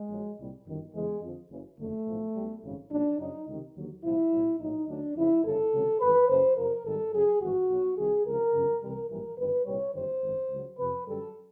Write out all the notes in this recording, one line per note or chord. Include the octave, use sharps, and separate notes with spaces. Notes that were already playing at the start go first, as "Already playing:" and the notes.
Already playing: G#3
A#1 A#2 F#3
C2 A#2 G3
G1 F#2 D#3
E2 C#3 E3 G#3
F2 D3 F3
F#1 F#2 C#3 E3
F#1 F2 D3 A3
B1 A2 F3
B1 B2 G3
G#1 F#2 C#3
A#1 A#2 F#3 D4
F#2 C#3 F#3 D#4
C#2 C3 D#3
D#2 D3 F#3
C2 A#2 F3 E4
B1 A2 F#3
A#1 A2 F#3 D#4
D2 D3 F#3 D4
F2 C#3 F3 E4
G1 F#2 C#3 A4
C#2 C3 D#3 F#3
G#1 G2 E3 B4
F#1 F#2 C#3 C5
F2 C3 F3 A#4
G#1 G#2 D#3 G3 A4
F#2 C#3 F#3 G#4
G#1 G2 E3 F#4
B1 B2 F#3
C2 C3 D#3 G#4
C#2 C3 F3 A#4
G1 F#2 C#3 F3
C2 C3 E3 G3 A#4
A#1 G#2 E3 G3 A#4
G1 F#2 D#3 B4
C2 A#2 G3 C#5
G1 F#2 D#3 G3 C5
G#1 F#2 D#3
C#2 C#3 F#3
F2 C3 F3 B4
F#2 D3 G3 A4